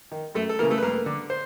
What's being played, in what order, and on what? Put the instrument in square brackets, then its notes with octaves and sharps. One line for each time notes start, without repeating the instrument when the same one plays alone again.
[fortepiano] D#3
F#2 A3 A4
A4
C#3 E3 A#3 A#4
A3 A4
B4
G2 A#3 A#4
D3
C5